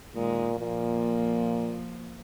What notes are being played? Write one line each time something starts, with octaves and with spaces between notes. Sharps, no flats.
A#2 D#3 G#3
A#2 F3 A#3